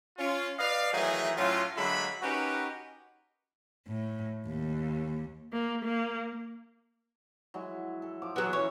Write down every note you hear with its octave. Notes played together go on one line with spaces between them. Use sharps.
C#4 F4
B4 D5 D#5 F5
D#3 E3 F#3 A3 D#4 G#4
A2 F#3 C#4 F4
D3 F#3 G#3 A#3 E5 B5
C#4 D#4 F#4 G4 A#4 B4
A2
D#2
A#3
A#3
F#3 G#3 E4
A4
F3 D6
E3 F#3 B3
C#4 E4 A4 C#5